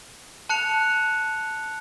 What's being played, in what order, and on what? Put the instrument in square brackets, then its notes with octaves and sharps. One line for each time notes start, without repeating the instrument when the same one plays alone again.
[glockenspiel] A5 F#6 C#7 F7